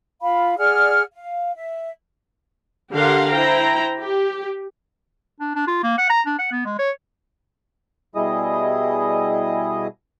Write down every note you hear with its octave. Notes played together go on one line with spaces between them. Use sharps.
F4 F5 B5
G#4 D5 F#5 F6
F5
E5
D3 G4 A#4 F5 F#5 C6
E4 C5 G5 A#5
G4
D4
D4
F4
A#3
F#5
A#5
D4
F#5
B3
G#3
C#5
B2 G3 E4 G#4 D#5 D#6